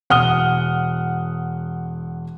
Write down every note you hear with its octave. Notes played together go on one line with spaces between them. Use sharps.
E1 F#5 D#6 F6 G7